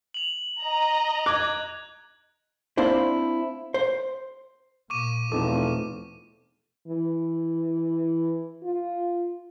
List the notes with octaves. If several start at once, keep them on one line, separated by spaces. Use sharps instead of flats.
F7 F#7
D#5 A#5
D6 F#6 G#6
A#3 C4 D4 E4 C5
C5
A#2 C#6 D6 D#7
E2 B2 F3 A3 C4 D#4 A4 D6
E3
F4